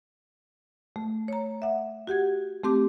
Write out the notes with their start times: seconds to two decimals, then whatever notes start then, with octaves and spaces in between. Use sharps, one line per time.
0.96 A3
1.28 C#5 A#5
1.62 E5 F#5
2.07 F#4 G4 F#5 G#6
2.64 A3 C4 G4 D6